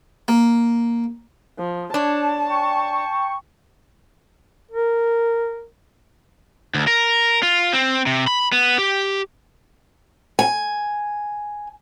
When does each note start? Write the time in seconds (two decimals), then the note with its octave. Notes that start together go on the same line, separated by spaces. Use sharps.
0.28 A#3
1.60 F3
1.94 D4 C#5 A5
2.49 G5 C#6
4.71 A#4
6.74 D2
6.88 A#4
7.43 F4
7.73 C4
8.06 C3
8.27 B5
8.52 B3
8.78 G4
10.39 G#5